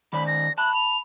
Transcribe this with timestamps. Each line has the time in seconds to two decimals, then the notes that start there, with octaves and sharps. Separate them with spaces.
0.13 D#3 C5 D5 B5
0.27 A#6
0.58 A5 B5 F#6
0.74 F7